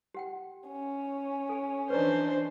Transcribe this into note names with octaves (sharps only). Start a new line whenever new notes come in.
G4 F#5 G5
C#4
A4 G#5
E3 D4 D#4 B4 C5 D5 A#5